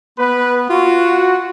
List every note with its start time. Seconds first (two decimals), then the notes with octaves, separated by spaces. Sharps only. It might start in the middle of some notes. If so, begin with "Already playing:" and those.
0.18 B3 B4
0.70 F4 F#4